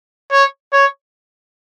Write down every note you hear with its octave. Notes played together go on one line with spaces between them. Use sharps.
C#5
C#5